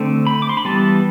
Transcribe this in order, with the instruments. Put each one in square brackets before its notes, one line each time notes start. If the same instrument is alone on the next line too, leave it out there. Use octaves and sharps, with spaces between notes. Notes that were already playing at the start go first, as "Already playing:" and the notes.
Already playing: [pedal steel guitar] D3 A3 C4
B5
D6
C6
B5
E3 G3 B3 A5